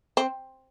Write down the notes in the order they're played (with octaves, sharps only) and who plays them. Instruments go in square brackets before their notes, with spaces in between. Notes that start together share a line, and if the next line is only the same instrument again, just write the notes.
[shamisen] C4